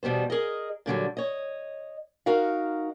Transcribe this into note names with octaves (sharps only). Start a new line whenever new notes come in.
E2 B2 G3 B3 C5
G#4 A#4 D#5
A#2 D3 F#3 G3
C#5 D#5
D#4 F#4 A#4 F5